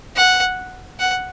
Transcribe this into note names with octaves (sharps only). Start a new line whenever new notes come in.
F#5
F#5